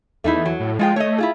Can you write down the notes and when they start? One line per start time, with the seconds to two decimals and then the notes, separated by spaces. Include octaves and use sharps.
0.24 E2 A3 D#4 E4
0.45 F#3
0.60 A2
0.79 F3 G#3 F4 G5
0.96 A3 C#5 D#5
1.18 E4 F4 G#4